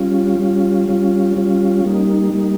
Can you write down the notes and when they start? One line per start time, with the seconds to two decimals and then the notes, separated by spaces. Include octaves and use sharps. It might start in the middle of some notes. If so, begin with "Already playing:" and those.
Already playing: G3 C#4 F4
0.39 G3 C#4 F4
0.89 G3 C#4 F4
1.37 G3 C#4 F4
1.85 G3 A#3 D#4
2.34 G3 A#3 D#4